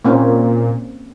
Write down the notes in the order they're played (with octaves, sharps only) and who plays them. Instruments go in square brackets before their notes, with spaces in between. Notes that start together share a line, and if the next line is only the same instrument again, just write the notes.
[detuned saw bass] A#2 [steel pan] A#3 C4 C#4